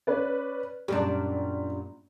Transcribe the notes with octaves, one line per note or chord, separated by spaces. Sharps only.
C#4 B4 D5
F#2 A#2 G3 D4